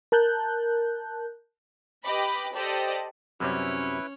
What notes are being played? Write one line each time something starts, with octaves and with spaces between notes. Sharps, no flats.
A#4 A5 F#6 G6
G4 B4 D#5 B5 D6
G4 A4 C5 D5 D#5
F#2 C3 G3 C#4 E4 B4 C#5